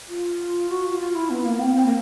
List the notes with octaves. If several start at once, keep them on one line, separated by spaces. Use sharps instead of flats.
F4
F#4
F4
F4
E4
B3
A#3
C4
C4
A#3